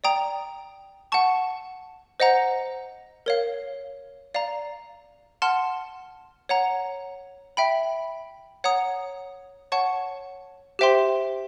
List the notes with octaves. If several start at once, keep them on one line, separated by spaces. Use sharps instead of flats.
D5 G5 A#5 D#6
F#5 A5 C#6
C5 D#5 F#5 A#5
A#4 C#5 F5
D5 F5 A#5
F#5 A5 C6 F6
C#5 F#5 A#5
E5 G5 B5
C#5 F#5 A#5 D#6
C#5 F#5 A5 C#6
G4 C5 E5 G5 C6